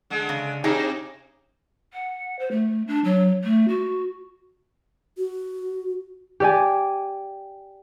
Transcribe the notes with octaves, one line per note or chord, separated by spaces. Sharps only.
D3 G#3
C#3
C3 D#4 G4 G#4
F#5
C5
A3
D4
F#3
A3
F#4
F#4
G4 D5 G#5